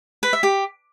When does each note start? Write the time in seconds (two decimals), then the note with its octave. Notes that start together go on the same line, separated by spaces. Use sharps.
0.23 B4
0.33 E5
0.43 G4